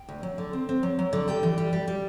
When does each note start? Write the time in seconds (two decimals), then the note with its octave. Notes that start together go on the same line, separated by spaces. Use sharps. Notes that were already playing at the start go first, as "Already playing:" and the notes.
Already playing: G5
0.09 D2
0.23 F#3
0.38 D3
0.53 C4
0.69 C4
0.83 F#3
0.99 F#3
1.13 D3
1.28 G3 G5
1.43 E3
1.58 G3
1.73 G3
1.88 G3